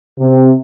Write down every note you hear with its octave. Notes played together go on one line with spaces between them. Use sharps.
C3